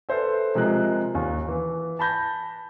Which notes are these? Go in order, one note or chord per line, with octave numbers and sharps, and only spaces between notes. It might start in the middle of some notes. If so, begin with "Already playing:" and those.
A4 B4 C5 E5
C3 F3 G#3 A#4 F#6
D#2
E3
A5 B5 G6 A#6